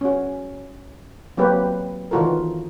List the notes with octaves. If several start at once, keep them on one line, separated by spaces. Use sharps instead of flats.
C#4 F#4
F#3 A#3 C4 F#4 G4 B4
D#3 E3 F4 F#4 A4 A#4